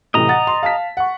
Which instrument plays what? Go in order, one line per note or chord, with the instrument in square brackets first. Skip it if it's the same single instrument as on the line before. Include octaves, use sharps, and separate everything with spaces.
[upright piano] A2 C3 E3 [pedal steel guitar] D#5 A#5
[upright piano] F#5 A6
C6
F5 A5 B6
F#5 C#6